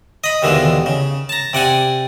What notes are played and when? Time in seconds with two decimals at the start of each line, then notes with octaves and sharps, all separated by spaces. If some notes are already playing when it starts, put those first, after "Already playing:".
0.24 D#5 B5
0.42 D#2 B2 D3 E3 G#3
0.86 C#3
1.29 A5 A#5
1.53 C3 D5 F#5 G#5